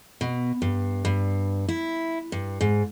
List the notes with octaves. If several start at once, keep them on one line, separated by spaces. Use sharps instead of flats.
B2
G2
G2
E4
G2
G#2